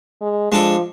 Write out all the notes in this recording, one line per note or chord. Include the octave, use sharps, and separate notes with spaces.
G#3
F3 G#3 D4 A4